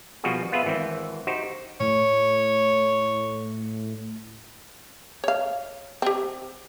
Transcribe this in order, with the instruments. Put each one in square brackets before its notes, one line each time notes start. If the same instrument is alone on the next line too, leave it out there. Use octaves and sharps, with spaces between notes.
[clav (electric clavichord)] B2 F3 G3 C4 F#4 G#4
B3 F4 G#4 B4 E5
G#1 E3 C4
D#4 F#4 G4 C5
[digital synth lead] A2 [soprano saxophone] C#5
[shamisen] C#5 F5
C4 G4